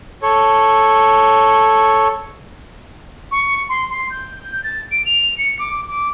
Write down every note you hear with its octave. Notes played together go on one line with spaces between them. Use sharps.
A4 C#5
C#6
C6
C6
G6
A6
D7
F7
C#7
D6
D6